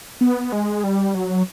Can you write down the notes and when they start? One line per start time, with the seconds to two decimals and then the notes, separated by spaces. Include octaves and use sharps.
0.21 B3
0.52 G#3
0.84 G3
1.15 F#3